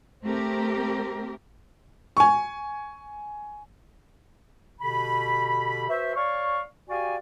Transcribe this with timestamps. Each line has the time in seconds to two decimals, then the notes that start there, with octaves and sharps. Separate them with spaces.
0.22 A3 C4 G4 A#4
2.17 G#5 C#6
4.80 B2 D3 G4 B5
5.88 F#4 B4 C5 E5
6.15 C#5 D5 F5 C#6
6.89 F#4 G4 D5 F5 G5 G#5